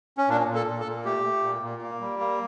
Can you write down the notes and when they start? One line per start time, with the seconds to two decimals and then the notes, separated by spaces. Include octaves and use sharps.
0.18 C#4
0.29 A#2 D4
0.48 A#2
0.55 A4
0.67 A#2
0.80 A4
0.86 A#2
1.05 A3 G4
1.24 A3
1.43 A#2
1.62 A#2
1.82 A#3
2.00 G3
2.19 A#3